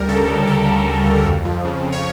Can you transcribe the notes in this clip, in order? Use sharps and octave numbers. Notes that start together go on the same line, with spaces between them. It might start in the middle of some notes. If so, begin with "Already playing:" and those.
Already playing: D2 G3 A#4
C#3 A4
D2
D2 A4
G3
C#3
D2
F2
F3
C#3
F2
C#5